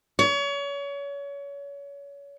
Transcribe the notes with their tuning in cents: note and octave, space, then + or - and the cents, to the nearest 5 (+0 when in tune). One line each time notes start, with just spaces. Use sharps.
C#5 +30